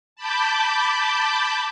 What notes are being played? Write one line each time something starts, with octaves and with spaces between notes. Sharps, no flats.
A5 B5 D6 G6